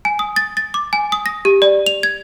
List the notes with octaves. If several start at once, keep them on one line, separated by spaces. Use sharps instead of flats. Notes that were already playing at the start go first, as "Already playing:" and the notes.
G#5
D#6
A6
A6
D6
G#5
D#6
A#6
G4
D5
F7
G#6